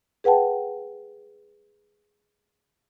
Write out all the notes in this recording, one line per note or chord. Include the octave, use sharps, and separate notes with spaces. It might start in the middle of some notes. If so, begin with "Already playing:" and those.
G#4 B4 F#5 G5 A5